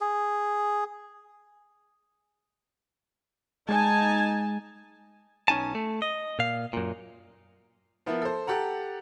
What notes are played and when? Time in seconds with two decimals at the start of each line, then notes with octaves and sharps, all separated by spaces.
0.01 G#4
3.69 G#3 D#4 G#5 A5
5.48 B1 C#4 D#4 G#5 A5
5.75 A3
6.02 D#5
6.39 A#2 F5
6.73 F#2 A#2
8.06 F3 B3 E4 A#4
8.22 A4 C5
8.47 G4 A4 F#5 A#5